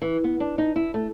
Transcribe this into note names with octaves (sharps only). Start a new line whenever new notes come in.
E3
B3
D4
D#4
E4
A3